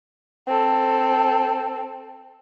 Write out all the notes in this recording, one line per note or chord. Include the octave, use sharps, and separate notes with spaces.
C4 A4